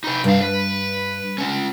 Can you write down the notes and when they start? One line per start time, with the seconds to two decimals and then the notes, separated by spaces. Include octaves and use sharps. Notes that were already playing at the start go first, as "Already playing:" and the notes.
0.04 D#4 B4
0.24 C2 G2 F5
0.41 B4
1.38 G#3 C#4